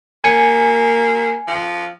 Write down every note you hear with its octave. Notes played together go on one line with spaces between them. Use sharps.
A#3 G#5 C#7
F3